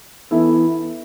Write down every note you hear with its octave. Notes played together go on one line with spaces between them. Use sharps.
E3 B3 E4 A4